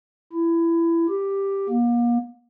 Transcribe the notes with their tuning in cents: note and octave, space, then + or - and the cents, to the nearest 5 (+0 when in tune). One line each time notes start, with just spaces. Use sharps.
E4 +20
G4 +5
A#3 +35